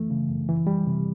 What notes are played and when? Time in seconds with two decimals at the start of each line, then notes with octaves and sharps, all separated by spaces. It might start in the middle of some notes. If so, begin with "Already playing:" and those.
Already playing: F#2 E3 A3
0.10 C#3
0.29 F#2
0.48 E3
0.67 G3
0.87 C3